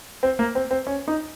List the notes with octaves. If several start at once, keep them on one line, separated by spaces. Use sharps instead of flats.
C4
A#3
C4
C4
C#4
D#4